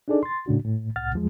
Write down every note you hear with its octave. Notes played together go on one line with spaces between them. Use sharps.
D4 D#4 G#4 A4 D5
C6 A6
A2 C#3 D4 F#4
A2
C2 A2 F#5 F6 A6
E2 F3 G#3